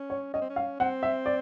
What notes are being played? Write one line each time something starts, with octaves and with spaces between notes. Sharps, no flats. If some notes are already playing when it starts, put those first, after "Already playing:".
Already playing: C#4
C#5
C#4 D#5
C4
C#4
F5
C4 F#5
E5
D5